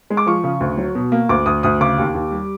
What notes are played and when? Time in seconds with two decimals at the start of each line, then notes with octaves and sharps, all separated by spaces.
0.10 G#3
0.17 D6
0.26 F3 C#6
0.44 C#3
0.60 D2
0.77 F#3
0.95 B2
1.12 A#3
1.29 D2 D6
1.46 D2 D#6
1.63 D2 D#6
1.81 C#3 D6
1.98 D#2
2.15 D#2
2.31 G3